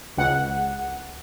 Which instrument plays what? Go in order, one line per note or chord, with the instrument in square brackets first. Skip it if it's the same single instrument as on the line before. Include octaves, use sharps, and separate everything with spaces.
[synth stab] C#2 F#5